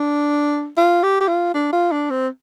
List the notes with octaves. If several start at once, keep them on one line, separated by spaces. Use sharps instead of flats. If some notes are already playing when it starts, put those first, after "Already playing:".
Already playing: D4
F4
G4
G4
F4
D4
F4
D4
C4